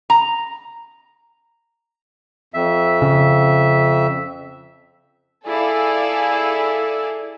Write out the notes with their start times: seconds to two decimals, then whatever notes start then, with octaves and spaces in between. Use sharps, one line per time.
0.10 A#5
2.54 F2 E5
3.02 C#3
5.45 E4 G#4 A4 D5 F5